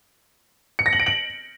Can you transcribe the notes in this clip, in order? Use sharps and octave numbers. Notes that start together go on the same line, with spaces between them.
C#7
A#6
F#7
D7
F#7